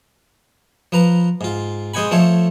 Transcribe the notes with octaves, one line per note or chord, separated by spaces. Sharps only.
F3 B4 A#5
G#2 F4
G#3 C5 D#5 F#5 G#5 B5
F3 A3 A4 C5 C#5